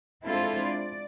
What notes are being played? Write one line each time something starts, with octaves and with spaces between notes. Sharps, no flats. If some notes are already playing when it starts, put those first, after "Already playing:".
G#3 C4 D4 E4 F4 A4
D5